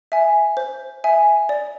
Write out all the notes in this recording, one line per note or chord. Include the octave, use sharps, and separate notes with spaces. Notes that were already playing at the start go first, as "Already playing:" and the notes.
E5 G#5
C5
E5 G#5
D5